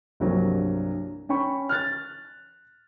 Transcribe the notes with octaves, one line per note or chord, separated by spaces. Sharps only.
C2 G2 F3 F#3 A#3
C#4 G5 B5 C#6
F6 F#6 A6